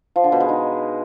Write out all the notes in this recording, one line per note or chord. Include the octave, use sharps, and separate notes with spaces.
F3
D3
B2
G#3
D#4